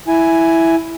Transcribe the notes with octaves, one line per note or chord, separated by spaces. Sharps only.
E4 G#5